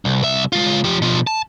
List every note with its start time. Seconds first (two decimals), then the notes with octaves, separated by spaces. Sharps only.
0.05 C2
0.23 C2 E5
0.52 G#3 F4
0.84 F3 G4
1.02 B2 F3
1.27 A5